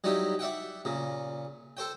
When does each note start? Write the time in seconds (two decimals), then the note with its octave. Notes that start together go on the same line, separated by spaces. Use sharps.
0.04 F#3 G3 D#4 E4 G4
0.39 D5 E5 F#5 G5
0.85 A#2 C#3
1.77 A4 C5 G5